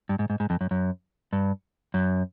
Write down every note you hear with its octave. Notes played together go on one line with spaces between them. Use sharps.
G2
G#2
G#2
G#2
F2
F#2
F#2
G2
F#2